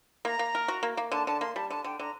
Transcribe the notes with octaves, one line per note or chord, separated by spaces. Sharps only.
A#3 A#5
A#3
A#4
F#4
A#3
A#3
D3 A5
D3 A5
A#3 C6
G3 A5
D3 A5
D3 G5
D3 A#5